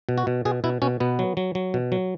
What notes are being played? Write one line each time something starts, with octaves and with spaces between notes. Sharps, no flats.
B2
F#4
B2
B2 G#4
B2 E4
B2 C#4
B2 B3
F#3
F#3
F#3
B2
F#3